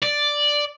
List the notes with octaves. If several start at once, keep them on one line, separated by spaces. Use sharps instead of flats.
D5